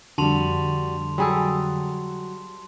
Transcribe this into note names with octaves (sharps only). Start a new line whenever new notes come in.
F2 D3 G3 F#4 A5 C6 F7
F#3 G3 G#4 A4